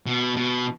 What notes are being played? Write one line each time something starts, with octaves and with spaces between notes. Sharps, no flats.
B2
B2